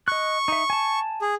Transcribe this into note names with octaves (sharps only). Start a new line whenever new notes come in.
D#5 C#6 F#6
D#4 E5
G#5 A5
G#4